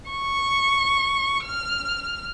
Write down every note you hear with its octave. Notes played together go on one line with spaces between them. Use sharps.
C#6
F6